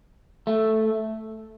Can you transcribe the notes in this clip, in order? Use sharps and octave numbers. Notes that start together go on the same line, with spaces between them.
A3